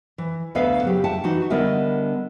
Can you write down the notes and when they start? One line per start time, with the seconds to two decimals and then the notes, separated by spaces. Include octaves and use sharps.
0.18 E3
0.55 D2 B3 A4 B4 E5 F5
0.83 C#3 F#3 G4
1.04 E5 F#5 G5 A5
1.24 E3 D#4 F#4
1.50 D3 G3 B3 A#4 D#5 E5